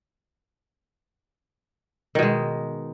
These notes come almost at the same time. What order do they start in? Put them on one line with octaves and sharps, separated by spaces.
D#3 B2 G#3